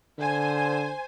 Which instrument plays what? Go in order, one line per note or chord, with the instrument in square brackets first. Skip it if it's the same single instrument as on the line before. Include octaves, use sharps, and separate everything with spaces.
[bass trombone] D3 [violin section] C5 G#5